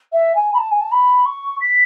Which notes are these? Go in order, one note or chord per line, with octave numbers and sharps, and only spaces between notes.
E5
G#5
B5
A5
G#5
A5
B5
C#6
B6